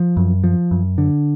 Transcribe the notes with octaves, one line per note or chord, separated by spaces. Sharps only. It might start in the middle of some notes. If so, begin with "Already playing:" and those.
Already playing: F3
F#2
F3
F#2
D3